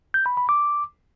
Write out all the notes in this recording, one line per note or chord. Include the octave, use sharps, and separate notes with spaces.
G6
B5
B5
D6